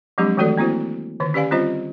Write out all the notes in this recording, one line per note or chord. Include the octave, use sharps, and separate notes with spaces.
F3 F#3 G#3 C4 D4 G4
D#3 E3 A3 F#4 A4 D5
A#3 C4 E4 F#4 C5
D3 D#3 B4
C#4 G4 B4 D5 F5 G#5
G3 C4 C#4 F4 C5 D#5